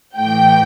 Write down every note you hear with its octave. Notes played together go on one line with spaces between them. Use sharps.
A2 E3 G5